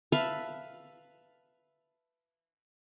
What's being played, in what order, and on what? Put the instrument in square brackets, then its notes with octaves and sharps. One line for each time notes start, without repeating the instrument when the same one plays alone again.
[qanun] B4 E5 F5 A5